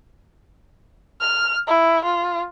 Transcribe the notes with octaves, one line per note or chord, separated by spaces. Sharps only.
F6
E4
F4